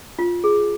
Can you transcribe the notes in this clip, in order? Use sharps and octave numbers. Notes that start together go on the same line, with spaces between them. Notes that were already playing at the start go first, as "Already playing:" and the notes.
F4
G#4